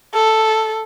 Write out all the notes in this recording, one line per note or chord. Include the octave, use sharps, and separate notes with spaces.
A4